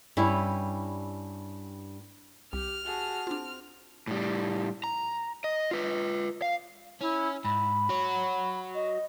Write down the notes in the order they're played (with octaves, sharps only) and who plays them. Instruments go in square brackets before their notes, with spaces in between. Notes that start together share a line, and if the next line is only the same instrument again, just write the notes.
[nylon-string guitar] G2 G3 C#4 E4
[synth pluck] C2 [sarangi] G4 [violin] F6
[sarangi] F#4 [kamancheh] G#4 A5
[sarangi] C4 [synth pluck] D4 F4
[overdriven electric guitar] A2 G3
A#5
D#5
F4 B4
F5
[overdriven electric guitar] C#4 [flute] E4
[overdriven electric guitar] G#2 [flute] B5
[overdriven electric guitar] F#4 C#5
[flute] D#5